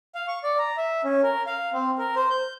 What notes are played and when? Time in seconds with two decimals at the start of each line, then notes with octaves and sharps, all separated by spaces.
0.15 F5
0.28 C#6
0.44 D5
0.59 A#5
0.77 E5
1.04 C#4
1.23 A#4
1.46 F5
1.73 C4
1.98 A#4
2.16 C5
2.30 G6